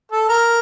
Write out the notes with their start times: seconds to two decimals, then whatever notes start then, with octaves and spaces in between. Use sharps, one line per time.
0.12 A4
0.29 A#4